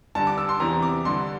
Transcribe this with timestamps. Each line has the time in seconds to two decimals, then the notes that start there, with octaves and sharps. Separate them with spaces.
0.15 G2 D3 A5
0.27 D6
0.38 E6
0.49 C6
0.60 E2 C3 E3 A#5
0.82 D6
1.05 G2 D3 C6